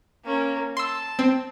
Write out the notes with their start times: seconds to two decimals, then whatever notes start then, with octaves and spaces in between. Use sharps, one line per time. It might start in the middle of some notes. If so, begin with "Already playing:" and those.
0.24 A#3 C#4
0.77 A5 C6 E6
1.19 C4